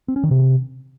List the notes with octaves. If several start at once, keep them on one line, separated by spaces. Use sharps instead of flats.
C4
C#4
D#3
C3